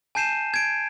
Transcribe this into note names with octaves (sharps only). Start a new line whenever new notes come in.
G#5 A5 G6 C7 D#7 E7
G#6 D7